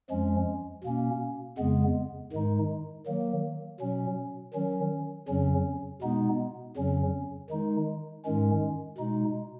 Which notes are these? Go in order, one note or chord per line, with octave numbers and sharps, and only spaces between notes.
F2 F3 G#3 C#4
B2 A#3 C#4
F2 C#3 G#3 B3
G#2 D#3 G#3 D#4
D#3 F#3 A#3
B2 F#3 C#4
D#3 F#3 C#4
F2 C#3 F#3 C#4
B2 G#3 B3 D#4
F2 C#3 F#3 C#4
D#3 G#3 D#4
G#2 D#3 G#3 C#4
B2 G#3 D#4